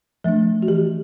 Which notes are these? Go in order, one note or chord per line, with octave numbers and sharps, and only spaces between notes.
F3 A3 D4
F#4
E3 G4